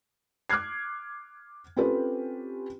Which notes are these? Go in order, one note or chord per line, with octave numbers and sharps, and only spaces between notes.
D6 F6 F#6 G#6 C7
C4 C#4 F4 G4 A4 B4